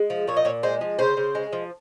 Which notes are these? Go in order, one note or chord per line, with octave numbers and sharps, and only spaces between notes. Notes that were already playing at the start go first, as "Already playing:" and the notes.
Already playing: G#3
F3
A#2 C#5
D#5
A#2 C#5
G#3 C5
F3
C#3 C5
C#3
G#3
F3